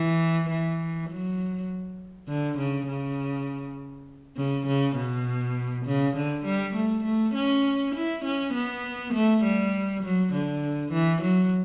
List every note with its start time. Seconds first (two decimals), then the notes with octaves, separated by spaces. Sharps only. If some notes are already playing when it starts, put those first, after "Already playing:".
Already playing: E3
0.49 E3
1.09 F#3
2.28 D3
2.58 C#3
2.88 C#3
4.37 C#3
4.66 C#3
4.96 B2
5.86 C#3
6.16 D3
6.45 G3
6.75 A3
7.05 A3
7.35 C#4
7.95 E4
8.25 C#4
8.54 B3
9.14 A3
9.43 G3
10.03 F#3
10.33 D3
10.92 E3
11.22 F#3